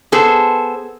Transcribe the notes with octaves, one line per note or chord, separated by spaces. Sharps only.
B3 G#4 A4 C5